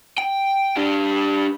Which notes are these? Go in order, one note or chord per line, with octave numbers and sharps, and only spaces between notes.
G5
G3 D4